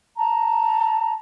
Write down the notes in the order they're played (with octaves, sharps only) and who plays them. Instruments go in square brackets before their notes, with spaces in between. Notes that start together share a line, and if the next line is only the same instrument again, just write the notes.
[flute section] A5 A#5